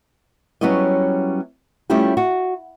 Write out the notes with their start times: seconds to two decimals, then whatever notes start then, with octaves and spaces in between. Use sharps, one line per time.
0.61 F#3 G3 B3 C#4 E4 D#5
1.90 G3 A3 C#4 E4 F4 G4
2.17 F#4